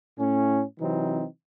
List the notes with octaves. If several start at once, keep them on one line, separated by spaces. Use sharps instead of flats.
A2 C#4
C3 E3 F#3 C4 D#4